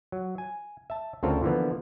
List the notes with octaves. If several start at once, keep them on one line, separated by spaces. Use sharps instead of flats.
F#3
G#5
E5 A5
D2 C#3 C4 F4 A4 A#4
D3 E3 F3 A#3 B3